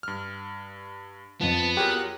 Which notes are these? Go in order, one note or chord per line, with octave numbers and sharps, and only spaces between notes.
G2 F6
F2 F3 B3 A5
F#3 F4 G4 G#4 A#4 F#6